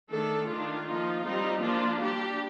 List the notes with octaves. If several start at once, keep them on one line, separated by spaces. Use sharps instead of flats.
D#3 A3 D4 A4
D#3 A3 D4 F4
F3 A#3 D#4
G3 C4 D#4
F3 A#3 D4 F4
G3 D4 G4